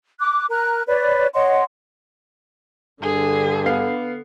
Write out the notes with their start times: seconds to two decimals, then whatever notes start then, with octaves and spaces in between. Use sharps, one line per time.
0.19 D6 F#6
0.50 A#4 A#5 F#6
0.87 B4 C#5 D5
1.34 C#5 D#5 F#5 C6
3.02 G2 D3 G#4
3.66 B3 F5 C7